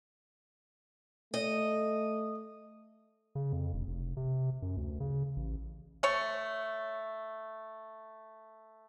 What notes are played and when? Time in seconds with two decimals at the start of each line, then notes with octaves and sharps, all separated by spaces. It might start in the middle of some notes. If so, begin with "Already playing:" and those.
1.34 A3 D#5
3.35 C#3
3.53 F2
3.73 E1
3.87 F1
4.17 C3
4.62 F#2
4.77 D2
5.00 C#3
5.36 A1
6.03 A3 C#5